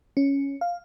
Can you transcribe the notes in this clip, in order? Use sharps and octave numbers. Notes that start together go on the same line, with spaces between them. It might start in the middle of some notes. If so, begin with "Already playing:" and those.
C#4
F5